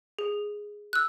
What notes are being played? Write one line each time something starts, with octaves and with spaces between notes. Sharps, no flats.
G#4
E6 F#6